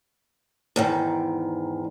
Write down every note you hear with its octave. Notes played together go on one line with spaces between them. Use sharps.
E2 G#2 D#3